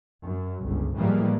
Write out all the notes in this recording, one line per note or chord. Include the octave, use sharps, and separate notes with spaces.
F#2
G1 C#2
A2 E3 F3 G3 G#3 A#3